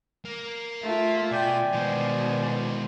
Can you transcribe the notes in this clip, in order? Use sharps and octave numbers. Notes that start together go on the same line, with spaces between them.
A#3
A3 F4 E5
B2 D5 G5 G#5
B2 D#3 E3 G#3 C5